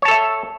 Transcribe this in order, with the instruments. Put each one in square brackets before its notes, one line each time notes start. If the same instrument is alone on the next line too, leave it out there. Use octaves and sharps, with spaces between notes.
[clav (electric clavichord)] C#5
A5
A4
E5